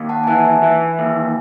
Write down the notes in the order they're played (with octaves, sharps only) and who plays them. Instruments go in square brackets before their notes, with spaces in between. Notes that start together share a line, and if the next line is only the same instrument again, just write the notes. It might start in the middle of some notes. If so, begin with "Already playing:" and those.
Already playing: [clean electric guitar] D#2
[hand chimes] F#5 A5
G#5
[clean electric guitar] E3 [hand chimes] F#5 A5
[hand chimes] E5 G#5
[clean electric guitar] E3
D#2